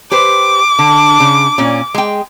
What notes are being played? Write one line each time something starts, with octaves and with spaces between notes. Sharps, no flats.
G4 B4 C5 D6
D3
C#3
A#2 C#4
G#3 G5